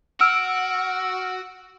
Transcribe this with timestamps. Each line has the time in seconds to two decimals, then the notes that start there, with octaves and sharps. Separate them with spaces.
0.21 F#4 E6 F6 D7